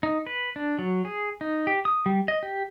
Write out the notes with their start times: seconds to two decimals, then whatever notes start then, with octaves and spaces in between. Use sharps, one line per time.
0.03 D#4
0.27 B4
0.56 D4
0.79 F#3
1.05 G#4
1.41 D#4
1.67 G4
1.85 D#6
2.06 G3
2.28 D#5
2.43 G4